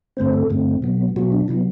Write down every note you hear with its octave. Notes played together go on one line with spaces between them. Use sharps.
G2 D3 A3 C4 C5
A4
G2 D3 A3 C4
B2 F#3 B3
B2 F#3 B3 F#4
D4
C3 F#3 B3 E4